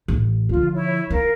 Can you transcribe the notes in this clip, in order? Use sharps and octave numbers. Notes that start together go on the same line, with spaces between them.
A1
D3 F3 F4
E4 C#5
E4 A#4 F5